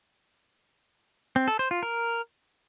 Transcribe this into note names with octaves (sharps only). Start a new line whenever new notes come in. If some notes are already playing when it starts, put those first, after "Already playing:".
C4
A4
C5
F4
A#4